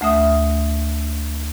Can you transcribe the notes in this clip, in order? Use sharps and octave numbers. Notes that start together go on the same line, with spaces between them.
D2 A3 E5 D#6